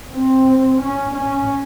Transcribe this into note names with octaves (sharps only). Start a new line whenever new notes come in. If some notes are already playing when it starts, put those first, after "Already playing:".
C4
C#4
C#4